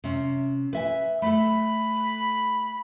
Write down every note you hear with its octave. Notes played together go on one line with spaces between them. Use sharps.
C3 C#4
B4 E5 G#5
A3 A4 B5